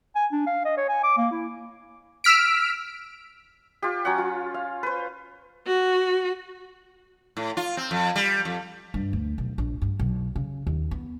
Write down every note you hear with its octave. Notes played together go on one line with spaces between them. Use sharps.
G#5
D4
F5
D#5
C#5
G#5
D6
A#3
E4
E6 F6 B6 D7
F4 G4
F#3 C#4 F#5
F4
F5
B4 C5
F#4
A2
F4
C4
F2
G3
F2
G2
D2
B1
A#1
G2
B1
C#3
D#2
B3